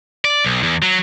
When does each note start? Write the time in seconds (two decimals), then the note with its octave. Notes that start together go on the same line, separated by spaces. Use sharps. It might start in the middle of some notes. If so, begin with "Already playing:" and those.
0.25 D5
0.45 B1
0.63 E2
0.82 F#3